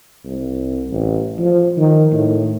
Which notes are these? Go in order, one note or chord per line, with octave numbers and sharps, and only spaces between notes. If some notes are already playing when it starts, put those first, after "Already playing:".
C2
A1
F3
D#3
A2